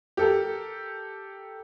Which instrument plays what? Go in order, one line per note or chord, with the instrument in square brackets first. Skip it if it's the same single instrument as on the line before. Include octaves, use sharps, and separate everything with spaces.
[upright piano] G4 A4 A#4